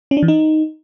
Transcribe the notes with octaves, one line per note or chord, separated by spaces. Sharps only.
C#4
D4
E3
D#4